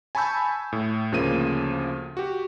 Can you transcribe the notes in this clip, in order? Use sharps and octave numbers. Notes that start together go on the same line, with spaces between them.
G#5 A5 B5 C#6 E6 G6
A2
D2 C#3 F3 A#3 D#7
F#4 G4